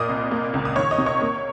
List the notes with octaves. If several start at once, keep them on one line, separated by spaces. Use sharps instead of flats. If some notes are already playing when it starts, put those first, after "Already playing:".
Already playing: A#2 A#3 D#5 D#6
C2
A#3
C#2
D#6
D#3 C#5 C#6
D#5 D#6
C3
C#5 C#6
A#3